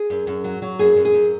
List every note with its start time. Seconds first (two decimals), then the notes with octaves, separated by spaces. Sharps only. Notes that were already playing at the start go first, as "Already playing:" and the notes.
Already playing: G#4
0.10 F#2
0.27 F#2
0.44 F#3
0.62 F#3
0.79 F#2 G#4
0.97 F#2
1.05 G#4
1.14 F#2